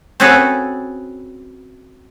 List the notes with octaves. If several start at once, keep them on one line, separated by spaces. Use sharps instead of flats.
C4 C#4 F#4 G#4 A4 B4